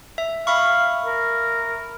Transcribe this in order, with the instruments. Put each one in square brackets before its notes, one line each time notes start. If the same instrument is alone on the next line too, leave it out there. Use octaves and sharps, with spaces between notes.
[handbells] E5
[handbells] E5 B5 C#6 [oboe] F5
[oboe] A#4